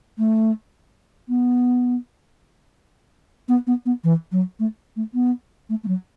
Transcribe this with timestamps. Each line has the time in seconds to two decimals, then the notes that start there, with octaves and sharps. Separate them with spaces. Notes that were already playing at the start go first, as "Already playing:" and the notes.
0.18 A3
1.29 B3
3.49 B3
3.67 B3
3.86 B3
4.04 E3
4.32 F#3
4.60 A3
4.96 A3
5.14 B3
5.69 A3
5.84 A3
5.88 F#3